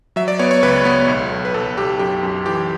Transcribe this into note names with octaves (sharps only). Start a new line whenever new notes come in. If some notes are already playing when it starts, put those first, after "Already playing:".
F#3 E5
D5
B3 C#5
C#5
C#2 B4
B3
B1
B1
B4
B1 A4
B1 G4
F#2 G4
F#2
E3 G4